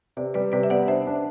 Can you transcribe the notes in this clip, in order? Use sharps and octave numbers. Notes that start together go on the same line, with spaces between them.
C3 B4 D5
G3 B4 D5
C3 B4 D5
E5
B3 D5 F#5
D4 C5 E5
D4